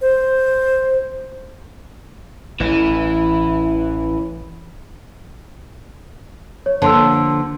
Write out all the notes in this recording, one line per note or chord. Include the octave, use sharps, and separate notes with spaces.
C5
A1 E3
C#5
D3 F3 A#3 A5 C6 E6